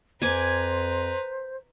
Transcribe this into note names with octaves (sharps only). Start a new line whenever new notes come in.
F2 B4 C5 G#5 A#5 D6